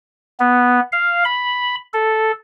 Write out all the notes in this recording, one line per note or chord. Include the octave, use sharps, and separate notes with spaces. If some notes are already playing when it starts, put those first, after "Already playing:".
B3
F5
B5
A4